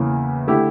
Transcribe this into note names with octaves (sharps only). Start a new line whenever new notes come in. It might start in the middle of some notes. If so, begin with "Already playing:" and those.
Already playing: E2 C#3 E3 A#3 E4
D3 A3 E4 G4